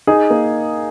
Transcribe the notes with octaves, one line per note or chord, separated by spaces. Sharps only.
D#4 G#4
A#3